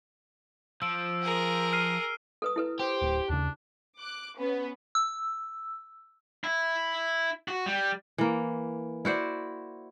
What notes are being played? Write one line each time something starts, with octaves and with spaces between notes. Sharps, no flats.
F3 E6 D7
G#4 A#4
F6 C7 D#7
A4 B4 D#6
E4 A4 B4
G4 C5
D1
D#2 C#3 D4
D6 F#6
B3 C#4 B4
E6
E4
F#4
G3
E3 A#3
E4 F#4 C5 D5